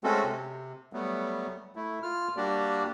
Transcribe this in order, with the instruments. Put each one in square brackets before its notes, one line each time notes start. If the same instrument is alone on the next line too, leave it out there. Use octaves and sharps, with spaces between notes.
[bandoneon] G#3 A3 C4 C#4 F#4 A4
C3
F#3 G3 A3 B3
A3 E4
F4 F6
G3 A#3 D4 F#4 G4 D5